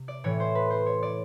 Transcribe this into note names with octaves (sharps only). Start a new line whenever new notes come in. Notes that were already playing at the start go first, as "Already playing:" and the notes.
Already playing: C3
D5
A2 E3 C#5
C5
B4
C5
C#5
D5